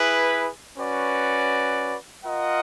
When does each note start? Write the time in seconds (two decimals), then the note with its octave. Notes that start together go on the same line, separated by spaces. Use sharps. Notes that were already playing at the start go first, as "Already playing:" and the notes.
Already playing: E4 G#4 B4
0.78 C#4 F#4 B4 D5
2.25 F4 A#4 D#5 F#5